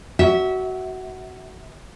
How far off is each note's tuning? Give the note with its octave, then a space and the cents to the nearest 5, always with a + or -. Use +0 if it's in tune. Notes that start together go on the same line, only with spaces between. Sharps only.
F#4 +15 E5 -20